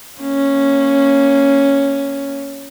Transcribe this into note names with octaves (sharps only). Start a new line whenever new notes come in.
A#3 C#4